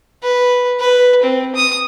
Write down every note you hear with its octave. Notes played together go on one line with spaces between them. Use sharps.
B4
B4
C4
D#6